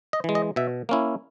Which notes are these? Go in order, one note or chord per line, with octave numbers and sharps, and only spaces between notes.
D#5
E3 G#3
D#5
B2 E5
A#3 C#4 E4